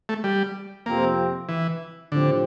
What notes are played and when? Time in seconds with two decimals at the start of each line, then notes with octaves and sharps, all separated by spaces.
0.09 A3
0.24 G3
0.86 F2 C3 F3 A#3 C4
1.49 E3
2.12 A2 D3 F3 C4 G4